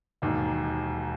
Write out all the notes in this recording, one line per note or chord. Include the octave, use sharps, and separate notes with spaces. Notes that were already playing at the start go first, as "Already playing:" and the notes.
E1 D#2 D#3